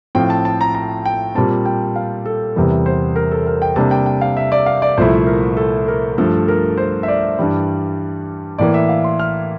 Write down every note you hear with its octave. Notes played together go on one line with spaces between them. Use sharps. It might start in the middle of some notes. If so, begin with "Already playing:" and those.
A2 F3 C4 F4 G5
A5
A5
A#5
A#5
G5
A#2 G3 C4 A5
G5
F5
A4
E2 C3 E3 G3 A#4
C5
A#4
A4
A#4
G5
C3 G3 A#3 D4 A5
G5
G5
F5
E5
D5
F5
D5
C2 A#2 F3 A3 E4 C5
A#4
A4
A#4
G2 F3 A3 A4
A#4
C5
E5
D5
G2 E3 G3
A2 E3 A#3 D5
E5
F5
C6
F6